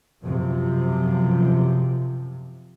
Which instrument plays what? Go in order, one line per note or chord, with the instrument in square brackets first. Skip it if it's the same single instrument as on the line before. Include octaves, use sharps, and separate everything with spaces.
[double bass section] F#2 C3 F3